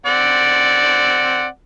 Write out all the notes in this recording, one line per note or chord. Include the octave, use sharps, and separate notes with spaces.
C4 D5 F#5